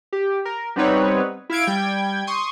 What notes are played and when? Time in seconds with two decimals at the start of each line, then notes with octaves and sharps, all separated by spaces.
0.13 G4
0.45 A#4
0.76 G3 B3 C4 D#4 B4 C#5
1.50 E4 F5 G#6 D7
1.67 G3 G5 G#6
2.27 C6 C#6 D#6